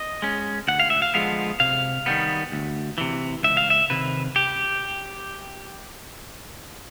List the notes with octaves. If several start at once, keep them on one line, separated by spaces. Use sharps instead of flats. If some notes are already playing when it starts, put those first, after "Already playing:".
Already playing: D#5
G#3 C#4
D2 F#5
F5
E5
F5
D3 F3 G#3 B3 F5
C3 F5
D#3 G3 B3
D2
C3 E3
C#2 E5
F5
E5
C3 D#3 B4
G4